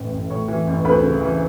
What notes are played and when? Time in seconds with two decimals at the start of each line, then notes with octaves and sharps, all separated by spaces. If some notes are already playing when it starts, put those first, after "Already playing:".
Already playing: A1 A2 E3
0.12 A1
0.30 A2 C#5 C#6
0.48 E3
0.67 A1
0.85 D2 B4 B5
1.03 C#3
1.21 E3